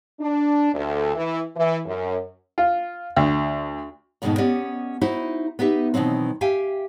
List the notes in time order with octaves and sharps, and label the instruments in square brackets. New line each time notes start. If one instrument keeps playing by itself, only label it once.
[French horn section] D4
D2
E3
E3
F#2
[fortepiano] F4
D2
[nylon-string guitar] F2 G#2 B2 D#3 A3 D#4
B3 C#4 G4 D5 D#5
D#4 E4 F#4 C5
B3 D#4 G4 E5
B2 D#3 E3 F#3 C4
G4 E5 F5 G5 G#5